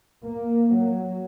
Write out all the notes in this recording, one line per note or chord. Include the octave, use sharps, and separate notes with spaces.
A#3
F#3